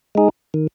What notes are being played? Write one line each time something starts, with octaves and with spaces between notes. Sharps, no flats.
G#3 D#4 G#4
D#3